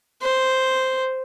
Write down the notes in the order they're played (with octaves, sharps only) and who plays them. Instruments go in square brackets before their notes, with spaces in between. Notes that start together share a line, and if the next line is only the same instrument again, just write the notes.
[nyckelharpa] C5